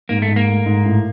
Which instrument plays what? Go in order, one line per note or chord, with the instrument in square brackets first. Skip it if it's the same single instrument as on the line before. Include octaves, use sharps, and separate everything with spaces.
[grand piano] G#2 [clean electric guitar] A#3
[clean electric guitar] A3
[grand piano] G#2
[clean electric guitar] A#3
[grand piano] A3
G#2
A2